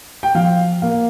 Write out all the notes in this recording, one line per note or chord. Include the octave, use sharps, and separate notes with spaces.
G5
F3 F5
A#3 F5